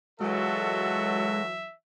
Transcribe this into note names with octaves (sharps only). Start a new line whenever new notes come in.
E3 F#3 G#3 F4 F#4 A4 E5